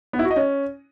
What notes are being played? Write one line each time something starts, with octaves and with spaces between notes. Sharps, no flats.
B3
E4
F#4
D#5
C#4